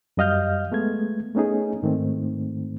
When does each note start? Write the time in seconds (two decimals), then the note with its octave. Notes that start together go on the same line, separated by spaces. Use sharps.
0.17 F#2 G3 D#5 F5 F6 G6
0.72 G#3 A3 B3 G#6
1.35 A3 B3 C#4 D#4 G#4
1.83 G#2 D#3 A3 C4